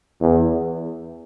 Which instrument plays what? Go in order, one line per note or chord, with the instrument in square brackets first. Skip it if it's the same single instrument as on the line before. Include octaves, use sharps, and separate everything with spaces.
[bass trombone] E2